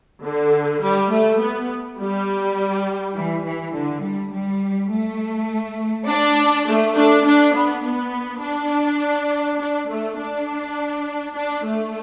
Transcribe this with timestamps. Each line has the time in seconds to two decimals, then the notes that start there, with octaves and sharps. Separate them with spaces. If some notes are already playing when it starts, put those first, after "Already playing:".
0.23 D3
0.82 G3
1.11 A3
1.40 B3
1.99 G3
3.16 E3
3.45 E3
3.74 D3
4.04 G3
4.33 G3
4.92 A3
6.09 D4
6.68 A3
6.97 D4
7.26 D4
7.55 B3
7.84 B3
8.43 D4
9.60 D4
9.90 A3
10.19 D4
11.36 D4
11.66 A3